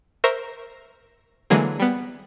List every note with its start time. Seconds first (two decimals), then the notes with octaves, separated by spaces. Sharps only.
0.24 A#4 C5 E5 A#5 C#6
1.50 D3 E3 F#3 G#3 A#3 G#4
1.80 G3 B3